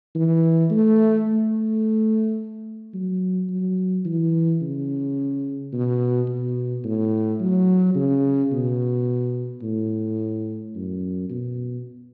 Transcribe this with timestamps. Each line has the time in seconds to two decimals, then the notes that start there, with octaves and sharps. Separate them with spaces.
0.15 E3
0.71 A3
1.27 A3
2.94 F#3
3.50 F#3
4.05 E3
4.62 C#3
5.73 B2
6.28 B2
6.84 A2
7.40 F#3
7.95 C#3
8.52 B2
9.62 A2
10.75 F#2
11.30 B2